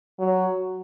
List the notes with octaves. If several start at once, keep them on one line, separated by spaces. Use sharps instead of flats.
F#3